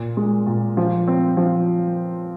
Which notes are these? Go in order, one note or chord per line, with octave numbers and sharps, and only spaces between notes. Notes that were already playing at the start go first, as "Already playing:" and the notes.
Already playing: A#2
G#3
A#2
F3
C4
F3